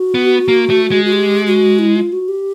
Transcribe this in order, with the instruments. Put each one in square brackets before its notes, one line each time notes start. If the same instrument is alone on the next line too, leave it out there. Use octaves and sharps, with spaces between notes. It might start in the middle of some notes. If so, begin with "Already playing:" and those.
Already playing: [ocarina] F#4
[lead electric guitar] B3
A#3
A3
G#3
[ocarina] F#4
G4
F#4
E4
F4
F#4
G4